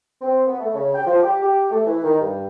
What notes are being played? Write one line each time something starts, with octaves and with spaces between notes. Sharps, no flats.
C4
B3
A3
C#3
G5
F3
G4
G4
A3
E3
D#3
G2